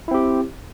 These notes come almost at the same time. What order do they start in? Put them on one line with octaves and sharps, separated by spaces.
E4 C4 G4